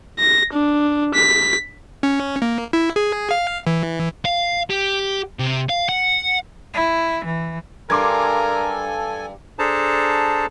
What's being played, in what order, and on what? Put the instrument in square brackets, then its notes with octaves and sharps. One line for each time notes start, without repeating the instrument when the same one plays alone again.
[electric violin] A#6
D4
B6
[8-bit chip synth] C#4
A#3
E4
G#4
F5
E3
[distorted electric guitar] F5
G4
C3
F5
F#5
[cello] E4
E3
[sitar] G2 [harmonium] A4 G#5 [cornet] A#4 [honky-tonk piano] C6 D6 G#6
[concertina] D4 G#4 A4 C5 A5 A#5